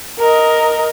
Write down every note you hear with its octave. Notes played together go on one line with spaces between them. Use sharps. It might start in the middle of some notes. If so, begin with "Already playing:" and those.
A#4 D#5